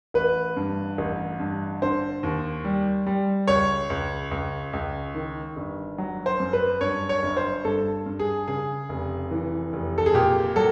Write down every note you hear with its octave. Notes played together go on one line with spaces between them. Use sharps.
A1 B4
G2
A1
G2
D3 C5
D#2
G3
G3
C#2 C#5
C#2
C#2
C#2
D#3
G1
F#3
C5
F#2
B4
G2 C#5
C#5
G1
C5
G2 A4
G2
G#4
C#3 G#4
F1
E3
F1
A4
G#4
A#2 G4
F#3 A4